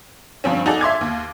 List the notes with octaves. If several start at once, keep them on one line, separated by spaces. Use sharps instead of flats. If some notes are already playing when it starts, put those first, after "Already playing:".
G2 F3 C4 C#4
D#4 F#4 G#4 A4 D5
E5 C6 D6 G#6
D#2